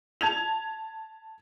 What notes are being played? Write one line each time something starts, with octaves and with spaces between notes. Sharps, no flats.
A5 G#6 F7